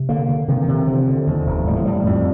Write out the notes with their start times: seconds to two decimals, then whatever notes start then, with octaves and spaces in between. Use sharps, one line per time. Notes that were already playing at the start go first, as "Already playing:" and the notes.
Already playing: C3
0.09 D3 A#3
0.29 D3
0.48 C3 D#3
0.62 D#3
0.68 C3
0.74 D#3
0.87 D3 F3
1.07 D3
1.27 D#2
1.46 F1
1.67 A2 G3
1.76 F3
1.85 A2 G3
2.06 F2